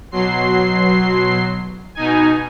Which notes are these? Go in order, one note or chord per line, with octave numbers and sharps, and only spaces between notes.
B2 F#3 C6 C7
B2 D#4 G#5